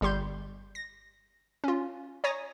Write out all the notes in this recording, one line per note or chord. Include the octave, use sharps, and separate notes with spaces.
G1 G3 G4 C6 G6
A#6
C#4 F4
C#5 G#5 A#5 D#6 A6 A#6